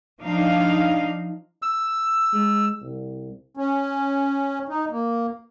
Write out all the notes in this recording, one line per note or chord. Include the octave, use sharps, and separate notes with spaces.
F3 D4 D#4 F5
E6
G#3
C2
C#4
D#4
A#3